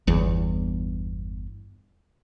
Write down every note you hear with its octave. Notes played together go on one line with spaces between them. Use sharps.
G1 E2